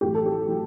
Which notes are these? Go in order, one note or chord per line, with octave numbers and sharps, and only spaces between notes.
A1 A2 F#3 G4
A4
G4
A2 F#3